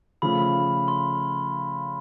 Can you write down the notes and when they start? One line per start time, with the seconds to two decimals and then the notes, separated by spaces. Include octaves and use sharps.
0.22 C#3 F3 A3 B5
0.88 C6